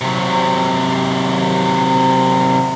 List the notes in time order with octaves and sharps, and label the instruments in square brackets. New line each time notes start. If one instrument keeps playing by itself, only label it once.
[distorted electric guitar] C3 F#3